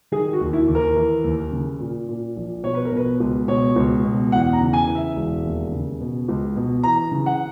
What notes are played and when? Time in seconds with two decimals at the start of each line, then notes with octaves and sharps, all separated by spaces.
0.12 D#3 G#4
0.33 F#4
0.40 D#2
0.53 E4
0.67 D#2
0.75 A#4
0.96 E3
1.24 D#2
1.52 C#3
1.80 A#2
2.08 A#2
2.36 A#1
2.63 B2 C#5
2.75 B4
2.85 A#4
2.92 B2 B4
3.20 C#2
3.48 B2 C#5
3.76 C#2
4.05 B2
4.32 E2 F#5
4.53 A#5
4.60 C#3
4.73 G#5
4.87 E3
4.95 E5
5.16 E1
5.44 D#2
5.72 C#3
6.00 B2
6.28 C#2
6.56 B2
6.83 E3 A#5
7.11 C#3
7.26 F#5